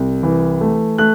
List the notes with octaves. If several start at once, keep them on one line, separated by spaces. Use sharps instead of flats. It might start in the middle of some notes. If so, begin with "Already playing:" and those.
Already playing: C2
E3
A3
A3 F#6